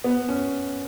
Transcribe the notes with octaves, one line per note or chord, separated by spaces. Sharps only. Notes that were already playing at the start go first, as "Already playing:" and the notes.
B3
C#4